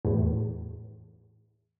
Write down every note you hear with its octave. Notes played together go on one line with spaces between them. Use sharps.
E2 A2